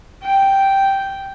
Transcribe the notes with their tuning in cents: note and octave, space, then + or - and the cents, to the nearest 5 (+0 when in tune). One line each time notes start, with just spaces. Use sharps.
G5 -5